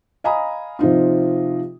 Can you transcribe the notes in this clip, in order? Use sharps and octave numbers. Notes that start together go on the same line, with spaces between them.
D#5 F5 G#5 A#5 B5 D#6
C3 F3 D#4 F4